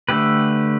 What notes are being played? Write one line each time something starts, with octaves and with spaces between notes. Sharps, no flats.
D3 A3 G4 B4